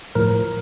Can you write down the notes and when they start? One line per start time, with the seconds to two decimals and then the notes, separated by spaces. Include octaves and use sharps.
0.15 A2 F3 A#4